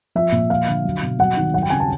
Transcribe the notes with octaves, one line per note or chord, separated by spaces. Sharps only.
F3 E5
A#2
F3 F5
D3
F#3
B2
F#3 F#5
D#3
F#3 F#5
G5
C#3 G#5
A5